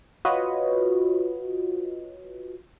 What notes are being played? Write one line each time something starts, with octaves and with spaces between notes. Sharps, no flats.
F4 F#4 B4 C#5 D#5